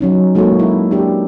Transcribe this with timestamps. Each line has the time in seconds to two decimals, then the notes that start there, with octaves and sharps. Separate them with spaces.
0.01 F#3 C#4 D#4
0.35 G#3 A#3 D#4 F#4 A4 C#5
0.59 E4
0.91 D4 G4